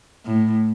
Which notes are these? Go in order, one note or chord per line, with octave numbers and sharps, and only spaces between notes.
A2